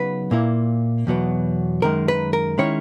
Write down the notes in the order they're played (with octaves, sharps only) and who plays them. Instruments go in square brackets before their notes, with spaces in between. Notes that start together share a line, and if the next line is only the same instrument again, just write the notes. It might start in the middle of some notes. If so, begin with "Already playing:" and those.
Already playing: [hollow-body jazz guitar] C#3 F#3 B3 D#4 B4
A#2 A#3 E4
E2 B2 F#3 B3
F#2 D#3 G#3 A#4
B4
A#4
D#3 G#3 C#4 E4 C#5